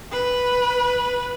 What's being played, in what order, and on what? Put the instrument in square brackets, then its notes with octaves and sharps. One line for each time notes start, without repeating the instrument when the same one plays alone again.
[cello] B4